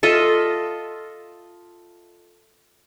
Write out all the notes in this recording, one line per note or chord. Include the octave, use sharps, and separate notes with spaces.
F4 A4 D#5 E5